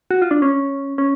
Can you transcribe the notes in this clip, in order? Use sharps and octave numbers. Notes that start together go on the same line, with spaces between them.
F#4
F4
D4
C#4
C#4